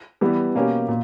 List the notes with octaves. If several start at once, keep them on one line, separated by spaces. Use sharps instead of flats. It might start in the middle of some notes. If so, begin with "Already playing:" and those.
E3 G3 B3
B2 A#3 C#4 G4
A#2